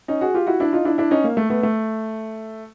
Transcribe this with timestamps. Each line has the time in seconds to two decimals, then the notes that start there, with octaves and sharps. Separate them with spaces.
0.08 C#4 D#4
0.21 F#4 G#4
0.34 F4 G4
0.47 E4 F#4
0.60 D4 E4
0.73 D#4 F4
0.85 D4 E4
0.98 D4 E4
1.11 C#4 D#4
1.24 A#3
1.37 A3
1.50 A3 B3
1.63 A3